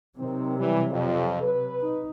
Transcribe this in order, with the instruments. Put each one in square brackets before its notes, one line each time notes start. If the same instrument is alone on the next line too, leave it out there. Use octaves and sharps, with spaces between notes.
[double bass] C3 F#3 [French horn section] D#3 C4
[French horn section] E3 G3
F2
B4
[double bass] D#4